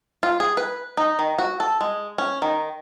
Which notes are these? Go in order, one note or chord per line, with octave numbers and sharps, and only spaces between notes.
F4
G#4
B4
D#4
D#3
F#4
A4
G#3
C#4
D#3